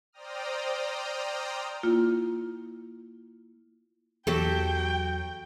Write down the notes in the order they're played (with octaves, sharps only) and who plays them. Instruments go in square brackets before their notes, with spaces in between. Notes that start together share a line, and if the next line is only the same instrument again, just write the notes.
[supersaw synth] C5 D5 G5 A#5 D#6 F6
[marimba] A#3 E4 F4
[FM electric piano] E2 [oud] F#3 G4 A4 [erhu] G5